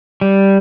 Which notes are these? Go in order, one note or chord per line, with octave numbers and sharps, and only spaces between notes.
G3